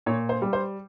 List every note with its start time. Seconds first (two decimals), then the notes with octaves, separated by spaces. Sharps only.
0.06 A#2 C#5
0.29 C5
0.42 G3
0.53 C5